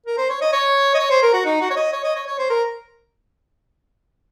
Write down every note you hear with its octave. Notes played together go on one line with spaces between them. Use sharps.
A#4
C5
C#5
D#5
C#5
D#5
C#5
C5
A#4
F#4
D#4
F#4
C#5
D#5
C#5
D#5
C#5
C#5
C5
A#4